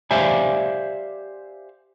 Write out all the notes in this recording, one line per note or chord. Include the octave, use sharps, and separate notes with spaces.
G4 C5 D5 E5 F5 G#5